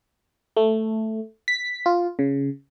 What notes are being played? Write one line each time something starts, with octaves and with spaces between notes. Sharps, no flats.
A3
B6
F4
C#3